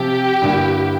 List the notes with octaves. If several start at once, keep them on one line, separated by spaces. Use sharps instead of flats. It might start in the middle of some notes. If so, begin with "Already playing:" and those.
Already playing: C3 F3 C4 G4
G2 D3 G3 A#3 E4